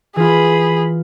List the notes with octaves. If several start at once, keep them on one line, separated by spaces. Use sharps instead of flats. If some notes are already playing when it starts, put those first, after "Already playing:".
E3 F4 G#4 B5